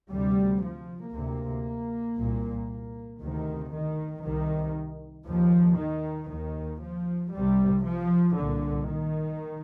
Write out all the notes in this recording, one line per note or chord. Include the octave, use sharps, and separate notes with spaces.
D2 C3 G3
F3
D2 C3 A#3
C2 A#2
D2 C3 D#3
D#3
C2 C3 D#3
D#2 F3
D#3
D#2 D#3
F3
C2 C3 G3
F3
C2 A#2 D3
D#3